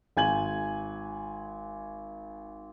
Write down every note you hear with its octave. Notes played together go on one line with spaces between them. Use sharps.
G#1 G#5 G#6 F#7